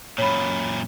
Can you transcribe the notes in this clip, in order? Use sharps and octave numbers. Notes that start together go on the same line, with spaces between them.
F#2 A#2 C#5 B5